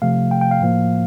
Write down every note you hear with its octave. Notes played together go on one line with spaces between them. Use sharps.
C3 F3 A3 F5
G5
G5
F5
A2 F3 A#3